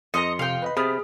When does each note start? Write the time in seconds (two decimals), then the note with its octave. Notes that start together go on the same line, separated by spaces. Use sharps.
0.14 F2 D#5 F5 A#5 C6 C#7
0.39 C3 F5 G5
0.62 B4 D#5 B5
0.77 C3 B3 G#4 B5 F6